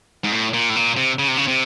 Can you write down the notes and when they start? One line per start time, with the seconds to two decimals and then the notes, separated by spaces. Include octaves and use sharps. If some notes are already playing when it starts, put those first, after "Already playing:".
0.24 G#2
0.32 A2
0.54 A#2
0.70 A2
0.76 A#2
0.97 C3
1.19 C#3
1.28 C3
1.37 C#3
1.48 C3